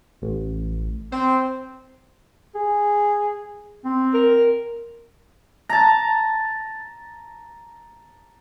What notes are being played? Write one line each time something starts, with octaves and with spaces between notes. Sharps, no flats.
A1
C4 C5
G#4
C4
A#4
A5 A#5